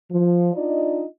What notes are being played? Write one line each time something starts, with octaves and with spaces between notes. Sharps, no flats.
F3
D4 D#4 F4 D5 D#5